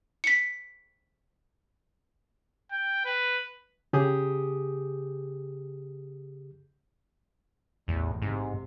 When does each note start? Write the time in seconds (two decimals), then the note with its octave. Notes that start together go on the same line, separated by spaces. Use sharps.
0.24 B6 C#7
2.72 G5
3.05 B4
3.93 C#3 G4 G#4 D#6
7.88 A1 E2 A2
8.22 G#2 C3